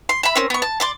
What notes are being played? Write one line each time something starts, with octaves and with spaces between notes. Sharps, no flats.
C6
E5 B5
C4 C#4 A#4
B3 C#6
A5
D5 C6 D6